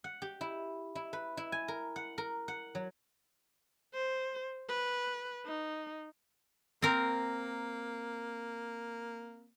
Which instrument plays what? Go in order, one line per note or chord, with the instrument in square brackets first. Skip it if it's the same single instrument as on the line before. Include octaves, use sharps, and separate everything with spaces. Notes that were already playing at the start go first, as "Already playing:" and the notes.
[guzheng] F#5
G4
E4
E4
B4
E4
G#5
A#4
F#5
A#4
F#5
F#3
[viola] C5
B4
D#4
[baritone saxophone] A#3 [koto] C4 A#4